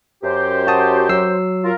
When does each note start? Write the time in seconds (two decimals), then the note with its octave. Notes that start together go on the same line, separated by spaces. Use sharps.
0.23 F#2 G4 C5
0.67 F#4 A5 D#6
1.09 F#3 E6 C7
1.64 F4 A#4